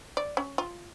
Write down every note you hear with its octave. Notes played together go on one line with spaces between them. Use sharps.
D5
C#4
F4